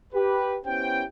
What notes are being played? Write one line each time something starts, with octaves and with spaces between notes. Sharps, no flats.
G4 B4
B3 C#4 E4 G4 C5 G5